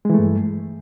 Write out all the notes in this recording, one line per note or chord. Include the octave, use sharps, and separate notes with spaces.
G2 E3 G#3 A3